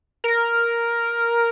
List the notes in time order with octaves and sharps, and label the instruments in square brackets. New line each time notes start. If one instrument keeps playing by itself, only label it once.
[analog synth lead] A#4